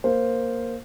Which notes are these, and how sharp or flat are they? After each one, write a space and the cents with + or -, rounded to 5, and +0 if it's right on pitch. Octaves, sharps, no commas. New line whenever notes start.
A#3 +0 C5 +0